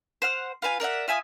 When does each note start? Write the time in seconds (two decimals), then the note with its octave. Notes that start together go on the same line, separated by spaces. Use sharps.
0.22 C5 F#5 F6
0.62 F4 B4 F5 G#5
0.80 A#4 D5 E5 F#5
1.08 F4 E5 G#5 D#6